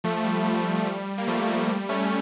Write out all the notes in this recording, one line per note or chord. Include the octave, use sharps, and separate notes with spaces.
F3 A3
A3
G3
F3
G3
G3 A#3
F3 A3
F3
G3
A3 C#4